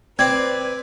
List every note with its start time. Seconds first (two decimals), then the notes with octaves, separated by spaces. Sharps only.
0.19 C4 B4 C5 D5 G#6